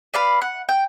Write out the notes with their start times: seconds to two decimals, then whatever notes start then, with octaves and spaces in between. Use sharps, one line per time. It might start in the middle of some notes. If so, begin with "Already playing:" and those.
0.14 B4 D5 F5 B5
0.42 F#5
0.69 G5